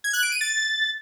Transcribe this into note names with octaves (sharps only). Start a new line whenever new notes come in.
G#6
F#6
D7
D#7
A6